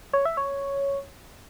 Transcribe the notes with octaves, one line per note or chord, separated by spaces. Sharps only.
C#5
E5
C#5